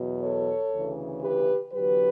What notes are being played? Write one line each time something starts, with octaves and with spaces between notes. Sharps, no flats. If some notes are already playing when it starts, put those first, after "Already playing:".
Already playing: E2 B2 F#3
A4 C#5
D2 C#3 E3
G4 B4
E2 D3 F#3 G4 B4